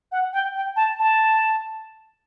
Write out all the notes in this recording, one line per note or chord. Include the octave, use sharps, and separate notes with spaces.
F#5
G5
G5
A5
A5